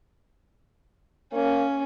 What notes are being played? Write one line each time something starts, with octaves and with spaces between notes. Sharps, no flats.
A#3 C#4